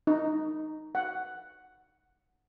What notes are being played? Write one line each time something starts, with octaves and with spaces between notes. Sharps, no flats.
D#4
F#5